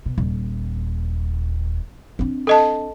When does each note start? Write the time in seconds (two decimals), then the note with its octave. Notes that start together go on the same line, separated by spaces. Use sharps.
0.06 B2
0.18 D#1
2.19 C4 D4
2.47 A4 D#5 A5